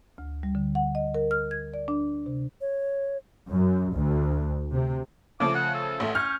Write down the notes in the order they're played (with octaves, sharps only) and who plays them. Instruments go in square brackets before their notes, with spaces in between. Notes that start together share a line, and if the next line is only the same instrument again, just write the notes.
[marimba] D2
G3
D3
F#5
D#5
A#4
F6
G#6
D5
D4
C3
[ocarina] C#5
[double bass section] F#2
D2
C3
[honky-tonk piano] C#3 F3 A3 [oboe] D6
[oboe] F#5
A4
[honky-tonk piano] A1 A3
[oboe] C#4 [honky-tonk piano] F6 G6